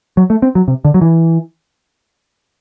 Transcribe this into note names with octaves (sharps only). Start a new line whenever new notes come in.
F#3
A3
C4
F#3
C3
D3
F#3
E3